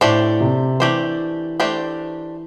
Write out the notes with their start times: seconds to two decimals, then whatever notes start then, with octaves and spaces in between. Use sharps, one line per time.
0.01 A2 A3 D4 G4 C5
0.41 C3
0.80 E3 A3 D4 G4 C5
1.60 A3 D4 G4 C5